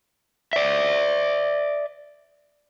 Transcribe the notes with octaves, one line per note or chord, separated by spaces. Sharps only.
D5 E5